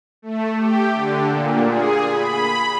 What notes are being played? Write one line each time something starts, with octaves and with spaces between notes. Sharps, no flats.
A3
G4
D3
A#2
G#4
B5